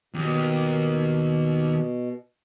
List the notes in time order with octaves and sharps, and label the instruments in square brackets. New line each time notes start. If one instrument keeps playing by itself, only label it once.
[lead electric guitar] D#2 [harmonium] B2